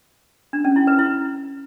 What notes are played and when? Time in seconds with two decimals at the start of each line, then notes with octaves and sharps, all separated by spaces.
0.53 D4
0.65 C#4
0.76 E4
0.87 B4
0.99 E4